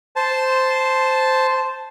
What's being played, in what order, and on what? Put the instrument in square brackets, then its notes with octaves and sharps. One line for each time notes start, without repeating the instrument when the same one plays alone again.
[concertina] C5 A5